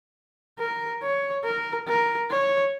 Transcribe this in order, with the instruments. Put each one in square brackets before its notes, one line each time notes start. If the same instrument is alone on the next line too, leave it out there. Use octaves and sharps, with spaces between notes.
[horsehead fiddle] A#4
C#5
A#4
A#4
C#5